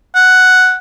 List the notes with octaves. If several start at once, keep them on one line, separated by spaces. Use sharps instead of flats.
F#5